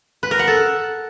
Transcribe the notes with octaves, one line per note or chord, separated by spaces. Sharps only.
B4
A#4
F#5
A4